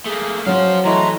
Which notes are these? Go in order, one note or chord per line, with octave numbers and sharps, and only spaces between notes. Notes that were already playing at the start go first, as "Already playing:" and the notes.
A3 A#3 G#4
F#3 C#4 C5 F5
E3 G#3 A3 A#5